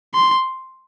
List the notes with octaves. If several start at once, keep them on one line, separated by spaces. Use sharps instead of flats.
C6